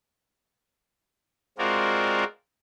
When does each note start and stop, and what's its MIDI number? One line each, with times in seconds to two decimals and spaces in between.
1.58 2.24 56
1.58 2.24 60
1.58 2.24 65
1.58 2.24 66
1.58 2.24 70
1.58 2.24 74